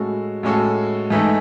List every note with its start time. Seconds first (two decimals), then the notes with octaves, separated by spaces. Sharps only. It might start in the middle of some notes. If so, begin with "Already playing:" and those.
Already playing: A2 G#3 C#4 F#4 A4
0.43 A2 G#3 C#4 F#4 A4
1.10 G#2 E3 A3 D#4 A4